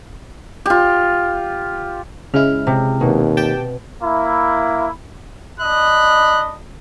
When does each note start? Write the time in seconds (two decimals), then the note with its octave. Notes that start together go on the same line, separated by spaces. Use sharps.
0.66 F4 G4
2.34 C#3 G#3 E4 F6
2.67 C3
3.01 D#2 B2
3.37 G4 G5 A5
4.02 A#3 E4
5.60 D4 D#5 B5 F#6